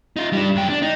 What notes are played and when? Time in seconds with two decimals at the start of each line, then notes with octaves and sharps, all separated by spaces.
0.16 D#4 F4
0.33 G3 D4
0.55 F#2 G5
0.69 D4
0.83 D#4